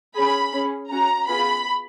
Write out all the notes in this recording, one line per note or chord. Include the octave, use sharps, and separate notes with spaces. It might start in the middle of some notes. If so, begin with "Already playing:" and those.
C#4 G#4 B5
C#4 G#4
C#4 F#4 A#5
B3 F4 G#4 B5